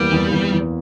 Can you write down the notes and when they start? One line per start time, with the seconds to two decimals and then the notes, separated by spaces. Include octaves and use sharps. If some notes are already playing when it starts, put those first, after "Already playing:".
Already playing: E2 G3 A#3
0.12 E2
0.32 E2
0.52 E2